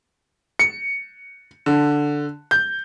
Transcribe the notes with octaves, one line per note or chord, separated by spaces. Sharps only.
C#7
D3
G6